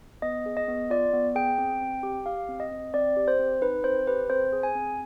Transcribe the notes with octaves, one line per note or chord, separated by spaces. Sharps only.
B3 D#5
G#4
D#5
B3
F4 D5
B3
G#4 G5
C4
C4
G4
G4 F5
C4
D#5
C4
C4 D5
G4
C5
C4
D#4 B4
C4 C5
G4 B4
C4 C5
G#4
G#5
C4